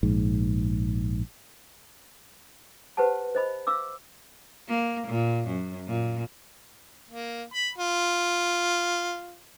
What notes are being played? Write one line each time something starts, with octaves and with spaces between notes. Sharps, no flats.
A#1 G#2
G4 B4 C5 F#5 A5
C5 D#5 B5
F5 D6 E6
A#3
A#2
F#2
A#2
A#3
B5
F4